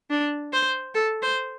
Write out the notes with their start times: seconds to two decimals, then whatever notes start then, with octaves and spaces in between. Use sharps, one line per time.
0.11 D4
0.53 C5
0.94 A4
1.22 C5